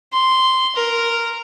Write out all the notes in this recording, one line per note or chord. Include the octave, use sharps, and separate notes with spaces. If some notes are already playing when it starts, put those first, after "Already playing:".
C6
A#4